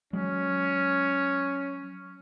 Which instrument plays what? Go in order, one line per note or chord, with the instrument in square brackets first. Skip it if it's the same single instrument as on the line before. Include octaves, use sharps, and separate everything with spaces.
[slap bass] F#3 G#3 [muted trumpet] C#4